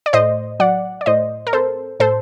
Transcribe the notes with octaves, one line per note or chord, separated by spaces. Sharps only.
D5
A2 C5 D#5
F#3 D5 F#5
D5
A2 C5 D#5
A#4
C4 A4 C5
A2 A4 C5